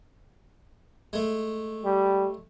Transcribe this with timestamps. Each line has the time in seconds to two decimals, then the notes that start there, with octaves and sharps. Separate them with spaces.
1.13 G#3 A3
1.85 G3